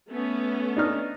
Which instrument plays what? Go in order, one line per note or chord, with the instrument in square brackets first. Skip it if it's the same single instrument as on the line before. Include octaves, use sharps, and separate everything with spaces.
[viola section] A3 B3 C#4
[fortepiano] D4 D#4 F6